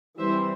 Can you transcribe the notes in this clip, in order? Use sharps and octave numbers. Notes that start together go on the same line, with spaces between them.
E3 G3 C4 C5 E5